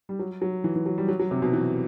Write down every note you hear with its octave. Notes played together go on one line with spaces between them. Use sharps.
G3
F#3
F#3
E3
E3
F#3
G3
F#3
F#3
C3
B2
E3